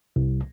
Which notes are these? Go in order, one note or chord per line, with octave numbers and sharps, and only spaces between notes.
C2